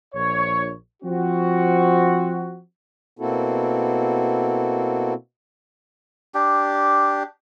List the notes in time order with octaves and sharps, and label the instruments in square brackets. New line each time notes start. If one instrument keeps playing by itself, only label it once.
[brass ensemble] A#1 C#5
F3 C4 F#4
[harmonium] B2 A#3 C4 E4 F#4 A4
[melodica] D4 G4